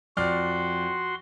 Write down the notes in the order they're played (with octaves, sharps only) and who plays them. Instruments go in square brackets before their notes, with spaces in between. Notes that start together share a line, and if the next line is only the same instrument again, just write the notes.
[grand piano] F2 D5 F6 [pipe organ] F#4 C6